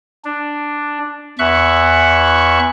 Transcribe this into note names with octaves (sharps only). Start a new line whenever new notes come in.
D4
E2 E5 C#6 F#6